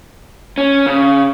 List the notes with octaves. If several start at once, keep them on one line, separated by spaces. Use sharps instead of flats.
C#4
C#3